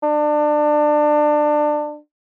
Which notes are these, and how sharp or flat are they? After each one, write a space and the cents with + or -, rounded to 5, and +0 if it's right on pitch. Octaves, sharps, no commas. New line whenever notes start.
D4 +25